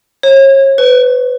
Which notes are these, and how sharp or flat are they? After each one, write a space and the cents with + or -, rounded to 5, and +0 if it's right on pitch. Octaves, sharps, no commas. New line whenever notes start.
C#5 -35
B4 +15